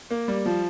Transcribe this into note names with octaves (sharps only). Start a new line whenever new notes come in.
A#3
G3
F3